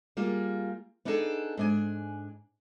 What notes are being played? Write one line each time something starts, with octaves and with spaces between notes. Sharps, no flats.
G3 A#3 F4 G#4
B3 D4 D#4 G#4 A4
G#2 D4 G#5